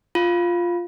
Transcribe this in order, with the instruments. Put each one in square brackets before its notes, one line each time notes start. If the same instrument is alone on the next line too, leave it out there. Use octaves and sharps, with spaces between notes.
[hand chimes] F4